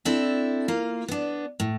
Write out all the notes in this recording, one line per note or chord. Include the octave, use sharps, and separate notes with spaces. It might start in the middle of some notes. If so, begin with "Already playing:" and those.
C4 D4 E4 A4
A#3 F4 F5
B3 D4
A2